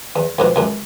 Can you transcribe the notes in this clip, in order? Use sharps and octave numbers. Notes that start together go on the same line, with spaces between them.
E2
C2 F2 B2
C#2 F#2